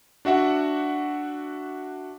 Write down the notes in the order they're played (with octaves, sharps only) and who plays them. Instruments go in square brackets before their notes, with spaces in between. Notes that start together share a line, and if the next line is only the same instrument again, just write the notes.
[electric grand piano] D4 F#4 E5 F#5